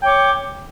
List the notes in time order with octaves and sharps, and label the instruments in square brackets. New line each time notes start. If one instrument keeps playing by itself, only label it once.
[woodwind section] G5
C#5
D6